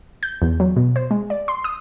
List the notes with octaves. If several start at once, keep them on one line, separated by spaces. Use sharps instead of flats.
G6
E2
F#3
B2
C5
G#3
D5
C6
D#6